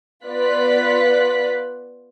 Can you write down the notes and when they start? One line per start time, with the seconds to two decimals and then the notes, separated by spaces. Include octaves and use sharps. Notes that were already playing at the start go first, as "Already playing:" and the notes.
0.24 B3 F4 D5 F#6 B6